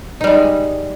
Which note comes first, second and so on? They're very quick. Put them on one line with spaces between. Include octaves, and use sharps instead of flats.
D#4 G3 G#3